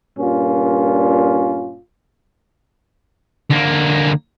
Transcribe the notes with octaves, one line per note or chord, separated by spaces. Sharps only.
G2 A#2 C#4 F4
D2 A#3